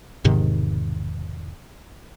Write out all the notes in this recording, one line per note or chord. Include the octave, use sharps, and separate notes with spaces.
E1 G#2 C3 D#3